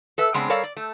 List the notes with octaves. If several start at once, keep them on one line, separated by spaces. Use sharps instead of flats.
A4 B4 E5
C#3 G#3 B3 C4 D4
G3 A4 A#4 C#5 D5 F5
D5
A3